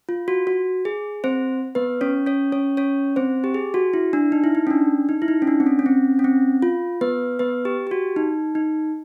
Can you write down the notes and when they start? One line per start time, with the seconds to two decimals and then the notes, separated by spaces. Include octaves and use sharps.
0.09 F4
0.28 F#4
0.47 F#4
0.85 G#4
1.24 C4 C5
1.75 B3 B4
2.01 C#4 C#5
2.26 C#4 C#5
2.52 C#4 C#5
2.77 C#4 C#5
3.16 C4 C5
3.44 G4
3.54 G#4
3.74 F#4
3.94 E4
4.13 D4
4.32 D#4
4.44 E4
4.55 D#4
4.67 C#4
4.71 D4
5.09 D#4
5.22 E4
5.28 D#4
5.42 C#4
5.47 D4
5.60 C4
5.66 C#4
5.79 C#4
5.86 C4
6.19 C#4
6.24 C4
6.62 F4
7.01 B3 B4
7.39 B3 B4
7.65 G4
7.87 G4
7.91 F#4
8.16 D#4
8.55 D#4